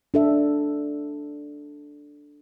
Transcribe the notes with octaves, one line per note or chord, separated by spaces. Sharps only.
D4 A4 E5